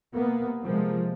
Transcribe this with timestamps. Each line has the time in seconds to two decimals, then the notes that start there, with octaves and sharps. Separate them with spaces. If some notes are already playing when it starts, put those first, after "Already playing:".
0.15 C3 A#3 B3
0.63 C3 F3 G#3 A#3